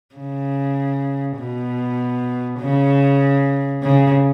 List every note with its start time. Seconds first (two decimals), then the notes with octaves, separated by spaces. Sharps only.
0.16 C#3
1.38 B2
2.60 C#3
3.83 C#3